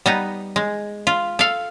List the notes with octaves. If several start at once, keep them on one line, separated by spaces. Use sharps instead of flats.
G3 B3 D#4
G#3
F4
A4 F5